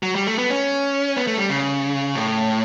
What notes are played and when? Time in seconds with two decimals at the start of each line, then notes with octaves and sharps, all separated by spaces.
0.03 F#3
0.15 G3
0.27 A3
0.38 B3
0.50 C#4
1.17 B3
1.27 A3
1.38 G3
1.49 C#3
2.15 A2